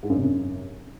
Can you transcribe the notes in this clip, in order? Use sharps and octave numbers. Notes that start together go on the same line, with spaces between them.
G#2
F#2
C3
F#2